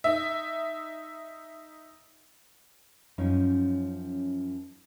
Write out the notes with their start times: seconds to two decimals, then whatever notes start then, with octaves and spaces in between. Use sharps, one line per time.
0.04 D#4 E5
3.18 F#2 F3 C#4 D#4